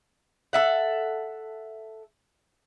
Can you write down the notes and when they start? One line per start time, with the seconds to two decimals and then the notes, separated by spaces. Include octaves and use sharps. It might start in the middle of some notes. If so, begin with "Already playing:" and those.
0.53 A4 E5 F#5